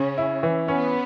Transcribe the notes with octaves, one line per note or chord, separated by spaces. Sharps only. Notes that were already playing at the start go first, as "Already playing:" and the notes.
Already playing: C#3 C#4
E4
E3
B3 C#4